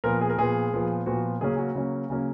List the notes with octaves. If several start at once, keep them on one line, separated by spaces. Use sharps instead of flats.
A#2 F3 B3 A#4
G#4
A#4
A#2 F3 B3 G#4
A#2 F3 B3
A#2 F3 B3 F#4
C#3 F#3 A#3 C#4 G#4
F#4
C#3 F#3 A#3 C#4
C#3 F#3 A#3 C#4